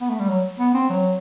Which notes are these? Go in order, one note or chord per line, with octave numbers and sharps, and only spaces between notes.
B3
A3
G3
F#3
B3
C4
F#3